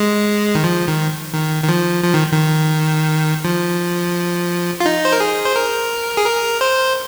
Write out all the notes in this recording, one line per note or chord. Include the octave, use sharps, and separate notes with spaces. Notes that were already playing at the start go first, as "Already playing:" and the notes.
Already playing: G#3
D#3
F3
D#3
D#3
D#3
F3
F3
D#3
D#3
F3
F4
D#4
C5
A#4
G#4
C5
A#4
G#4
A#4
C5